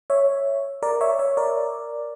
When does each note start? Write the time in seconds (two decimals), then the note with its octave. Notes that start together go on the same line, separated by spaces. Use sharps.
0.10 C#5 E5
0.83 A#4 D5
1.01 C#5 E5
1.19 C#5 E5
1.37 A#4 D5